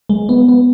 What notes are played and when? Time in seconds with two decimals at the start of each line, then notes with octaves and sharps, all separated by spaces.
0.09 G#3
0.29 B3
0.48 B3